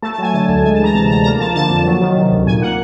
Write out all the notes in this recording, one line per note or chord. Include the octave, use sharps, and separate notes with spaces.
A3 A5
A5
F#3 G#5
D3 A5
D2 A5
G#3 G#5
A5
E3
A#5
C3 A5
D2 A#5
A#3 A#5
F3 A5
D3 A5
F2
F#3
D#3
C3
D2
A#2 G#5
A#3 F#5